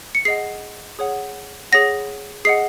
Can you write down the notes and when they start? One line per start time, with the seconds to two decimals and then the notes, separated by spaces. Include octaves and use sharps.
0.15 C#7
0.25 G#4 D#5 F#5 C7
0.99 G#4 C#5 F#5
1.72 G#4 C#5 F#5 A#6
2.45 G#4 D#5 F#5 C7